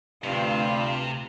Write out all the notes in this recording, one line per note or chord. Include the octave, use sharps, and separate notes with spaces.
D2 G2 C3 C4 F4